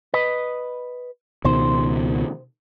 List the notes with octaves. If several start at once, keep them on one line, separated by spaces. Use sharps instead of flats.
B4 D#5
C#2 B2 D#3 C5